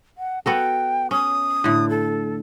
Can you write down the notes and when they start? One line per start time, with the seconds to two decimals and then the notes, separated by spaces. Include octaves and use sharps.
0.18 F#5
0.46 B3 F#4 A4 G5
1.11 C#4 D#6
1.64 A2 D3
1.89 A4